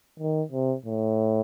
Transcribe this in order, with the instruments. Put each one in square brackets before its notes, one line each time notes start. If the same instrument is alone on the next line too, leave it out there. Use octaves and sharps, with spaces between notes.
[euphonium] D#3
C3
A2